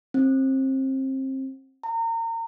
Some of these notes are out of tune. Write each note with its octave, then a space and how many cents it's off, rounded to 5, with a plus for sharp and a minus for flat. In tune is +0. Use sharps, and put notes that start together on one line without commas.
C4 +25
A#5 -30